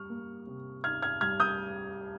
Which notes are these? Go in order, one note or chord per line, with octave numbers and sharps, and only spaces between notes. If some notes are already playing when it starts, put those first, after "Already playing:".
Already playing: G3 C#6 F6
A#3
C3
D#4 F6 G#6
F6 G#6
G3 F6 G#6
D#6 G6